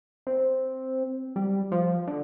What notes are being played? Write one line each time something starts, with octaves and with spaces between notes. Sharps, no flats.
C4
G3
F3
D3